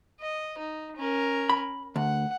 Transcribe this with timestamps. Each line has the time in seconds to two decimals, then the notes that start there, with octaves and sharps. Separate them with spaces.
0.20 D#5
0.58 D#4
0.97 C#4 A#4
1.49 B5
1.96 D2 F#5